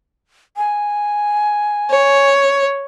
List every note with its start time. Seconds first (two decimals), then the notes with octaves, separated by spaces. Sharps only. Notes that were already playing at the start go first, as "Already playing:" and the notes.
0.57 G#5
1.90 C#5